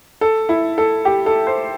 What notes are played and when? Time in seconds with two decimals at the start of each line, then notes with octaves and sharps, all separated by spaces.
0.21 A4
0.49 E4
0.78 A4
1.05 G4
1.26 A4
1.47 C5